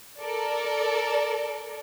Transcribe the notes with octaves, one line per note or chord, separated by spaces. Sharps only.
A4 A#4 D5